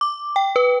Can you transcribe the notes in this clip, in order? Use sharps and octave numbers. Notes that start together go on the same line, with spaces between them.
D6
G5
B4